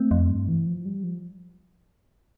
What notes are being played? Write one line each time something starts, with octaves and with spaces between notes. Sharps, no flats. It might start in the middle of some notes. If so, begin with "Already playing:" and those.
Already playing: A3 C4
F2
G2
E3
F3
G3
F3